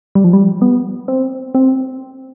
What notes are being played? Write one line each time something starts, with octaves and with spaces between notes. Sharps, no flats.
G3
F3
G3
B3
C4
C4